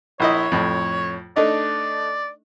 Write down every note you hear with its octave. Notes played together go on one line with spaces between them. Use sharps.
A#1 E4 C#5 D#5
F2 A2
A3 D4 D#4 D5